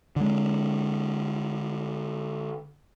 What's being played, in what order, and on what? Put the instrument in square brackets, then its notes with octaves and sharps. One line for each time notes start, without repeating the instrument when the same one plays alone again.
[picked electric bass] D3 G#3